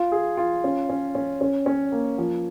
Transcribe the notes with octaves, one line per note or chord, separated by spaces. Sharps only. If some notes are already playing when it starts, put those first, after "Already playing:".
Already playing: F4
G#4
F4
C#4
C#4
C#4
C#4
C#4
A#3
F3